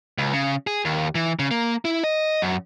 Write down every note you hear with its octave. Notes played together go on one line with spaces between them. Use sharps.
C#2
C#3
G#4
D#2
E3
C#3
A#3
E4
D#5
F#2